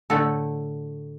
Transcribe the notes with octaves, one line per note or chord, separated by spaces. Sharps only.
A2 D3 A3 F#4 A4